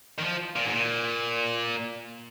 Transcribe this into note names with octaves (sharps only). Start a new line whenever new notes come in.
D#3
F3
A#2
G#2
A#2